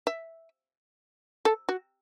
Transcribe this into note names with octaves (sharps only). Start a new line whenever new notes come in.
E5
A4
F#4